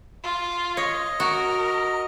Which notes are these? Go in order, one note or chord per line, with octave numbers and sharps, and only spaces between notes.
F4
C#5 D#5
F#4 A#4